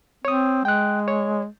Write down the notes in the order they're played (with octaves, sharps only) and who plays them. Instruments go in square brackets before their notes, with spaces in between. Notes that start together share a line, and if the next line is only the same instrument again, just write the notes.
[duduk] C4 [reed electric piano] C#5 D#6
[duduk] G#3 [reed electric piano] G5 F#6
[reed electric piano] C#5